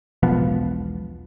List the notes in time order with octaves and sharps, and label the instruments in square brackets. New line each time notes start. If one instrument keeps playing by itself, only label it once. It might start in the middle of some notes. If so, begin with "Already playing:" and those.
[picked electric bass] E1 B1 F3 B3